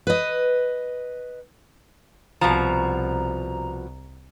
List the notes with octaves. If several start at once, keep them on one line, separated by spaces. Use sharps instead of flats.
B4 D#5
C2 B2 F3 A#5